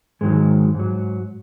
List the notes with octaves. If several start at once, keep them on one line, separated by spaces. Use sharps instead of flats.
G#2 D#3 F#3 G#3
G#2 F#3